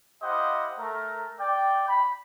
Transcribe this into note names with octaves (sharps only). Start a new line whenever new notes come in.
E4 G4 C5 D#5 F5 F#5
A3 A#4
D5 G5
B5